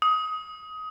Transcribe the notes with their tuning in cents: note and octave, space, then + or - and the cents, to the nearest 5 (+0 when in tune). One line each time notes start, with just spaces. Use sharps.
D#6 +20